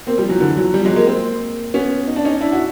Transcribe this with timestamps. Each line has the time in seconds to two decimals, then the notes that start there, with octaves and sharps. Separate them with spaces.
0.07 A#3 C4
0.18 F3 G3
0.29 E3 F#3
0.40 D3 E3
0.57 E3 F#3
0.74 F3 G3
0.85 F#3 G#3
0.96 G#3 A#3
1.07 A#3 C4
1.74 B3 C#4
2.08 D#4
2.16 D4
2.25 C#4 D#4
2.41 D4 E4
2.52 E4 F#4